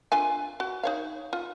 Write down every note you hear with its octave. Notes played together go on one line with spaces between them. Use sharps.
D4 F4 G#5
F#4
D#4 C#5 F5
F4